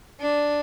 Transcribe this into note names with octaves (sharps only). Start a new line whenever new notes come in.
D4